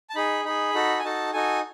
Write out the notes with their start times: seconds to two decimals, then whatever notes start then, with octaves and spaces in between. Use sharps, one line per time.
0.10 A5
0.15 D#4 G#4 B5
0.44 D#4 G#4 B5
0.74 D#4 F#4 A4
0.99 G#5
1.04 D#4 F#4 A4 A5
1.33 D#4 F#4 A4 G#5